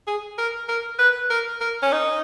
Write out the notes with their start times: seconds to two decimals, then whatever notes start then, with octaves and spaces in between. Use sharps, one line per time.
0.07 G#4
0.38 A#4
0.68 A#4
0.99 B4
1.30 A#4
1.60 A#4
1.82 C#4
1.92 D#4